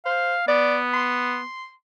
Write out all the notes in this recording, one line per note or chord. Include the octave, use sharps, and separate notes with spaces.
C5 F5
B3 D5
C6